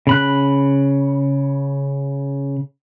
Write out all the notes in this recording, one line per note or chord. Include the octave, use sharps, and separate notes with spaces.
C#3 B5 F#6